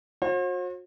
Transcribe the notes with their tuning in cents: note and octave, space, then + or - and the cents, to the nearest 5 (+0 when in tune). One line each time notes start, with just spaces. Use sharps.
F#4 -40 C5 +45